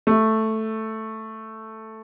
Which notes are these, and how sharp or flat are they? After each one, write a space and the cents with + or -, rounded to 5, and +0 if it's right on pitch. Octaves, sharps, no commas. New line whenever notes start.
A3 +0